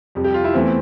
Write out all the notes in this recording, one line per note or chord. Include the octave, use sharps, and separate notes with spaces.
F2 C3 G3
G4
F4
E4
E2 E3 A3 C4